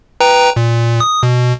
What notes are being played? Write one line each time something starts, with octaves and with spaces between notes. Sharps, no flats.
B4 G5 A#5
A#2
D#6
B2